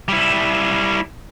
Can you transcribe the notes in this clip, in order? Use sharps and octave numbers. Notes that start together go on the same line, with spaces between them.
G3 E4